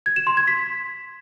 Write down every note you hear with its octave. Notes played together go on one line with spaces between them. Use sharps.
G#6
E7
C6
G#6
B6